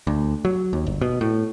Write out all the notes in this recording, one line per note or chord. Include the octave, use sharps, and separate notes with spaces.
D2
F#3
D#2
G1
B2
A2